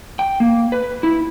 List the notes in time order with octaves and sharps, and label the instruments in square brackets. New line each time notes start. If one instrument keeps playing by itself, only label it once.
[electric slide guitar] G5
A#3
B4
E4